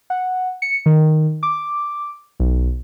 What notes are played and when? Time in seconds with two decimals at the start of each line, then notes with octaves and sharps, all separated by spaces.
0.10 F#5
0.62 C#7
0.86 D#3
1.43 D6
2.40 B1